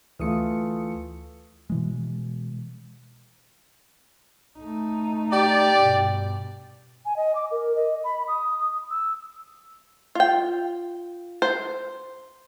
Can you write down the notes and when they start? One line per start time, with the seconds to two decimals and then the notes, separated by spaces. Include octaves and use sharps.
0.19 D2 E3 A3 F4 D#6 C#7
1.70 B2 E3 G#3
4.59 A3 D#4
5.33 G4 D5
5.75 G2 B2
7.05 G#5
7.16 D#5
7.35 D6
7.51 A#4
7.76 D#5
8.04 B5
8.28 D#6
8.91 E6
10.15 F4 G5
11.42 C5